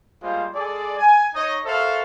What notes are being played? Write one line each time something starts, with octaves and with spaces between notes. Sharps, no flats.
G3 G#3 A#3 F4 C5
G#3 G#4 A4 D5
G#5
D#4 C#5 D#5
F#4 A4 A#4 C5 E5 F5